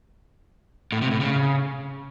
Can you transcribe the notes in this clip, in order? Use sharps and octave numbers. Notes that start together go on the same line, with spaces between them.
A2
C3
A2
C#3